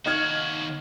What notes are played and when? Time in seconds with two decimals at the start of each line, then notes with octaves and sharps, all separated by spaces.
0.06 D#2 D#4 F#4 F6 G#6